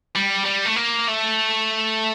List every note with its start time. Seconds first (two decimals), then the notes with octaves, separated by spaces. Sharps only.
0.15 G3
0.46 G3
0.66 A3
0.76 A#3
1.08 A3